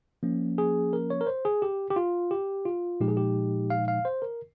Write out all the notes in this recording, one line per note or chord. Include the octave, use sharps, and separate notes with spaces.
F3 A#3 C#4
G#4
A#4
C#5
A#4
C5
G#4
G4
G4
F4
G4
F4
A#2 F3 G#3 D#4 G4
G#4
G4
F5
F5
C5
A#4